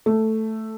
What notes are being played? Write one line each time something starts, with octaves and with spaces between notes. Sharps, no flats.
A3